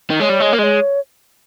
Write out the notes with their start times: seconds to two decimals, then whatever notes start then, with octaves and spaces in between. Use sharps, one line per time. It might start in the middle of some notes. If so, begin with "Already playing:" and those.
0.10 D#3
0.20 G#3 C#5
0.30 G3
0.40 G#3
0.53 A#3
0.59 G#3 D#5
0.64 C#5